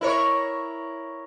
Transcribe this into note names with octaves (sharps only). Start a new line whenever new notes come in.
E4 A#4 C#5